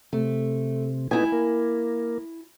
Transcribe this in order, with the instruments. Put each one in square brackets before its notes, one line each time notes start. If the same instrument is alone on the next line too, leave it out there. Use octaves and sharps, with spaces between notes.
[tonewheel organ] C3 [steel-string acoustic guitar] A3
[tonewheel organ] A3 B3 D#4 [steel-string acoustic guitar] E4 G#5
[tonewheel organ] A#3